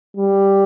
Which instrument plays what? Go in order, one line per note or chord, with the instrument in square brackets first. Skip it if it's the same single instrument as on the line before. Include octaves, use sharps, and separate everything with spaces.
[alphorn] G3